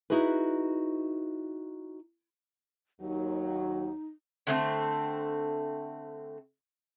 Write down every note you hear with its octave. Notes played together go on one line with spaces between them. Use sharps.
D#4 E4 F#4 G#4 B4
D#2 F#3 D#4
D3 A3 C4